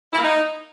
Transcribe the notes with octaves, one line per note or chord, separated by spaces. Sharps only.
E4
A#3
D#4